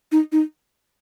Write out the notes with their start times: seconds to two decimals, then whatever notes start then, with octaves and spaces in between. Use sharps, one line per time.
0.12 D#4
0.32 D#4